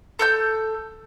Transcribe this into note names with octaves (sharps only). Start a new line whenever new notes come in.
A4 E6 G6